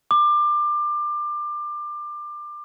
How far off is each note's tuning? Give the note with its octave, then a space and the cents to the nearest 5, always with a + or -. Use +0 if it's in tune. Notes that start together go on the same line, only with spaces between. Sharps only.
D6 +25